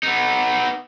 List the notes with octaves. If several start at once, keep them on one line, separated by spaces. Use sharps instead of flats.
B3 D#4